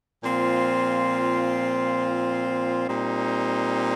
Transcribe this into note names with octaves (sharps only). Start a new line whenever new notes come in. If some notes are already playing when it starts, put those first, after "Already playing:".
A#2 F3 C4 F4
A#2 G3 C4 D#4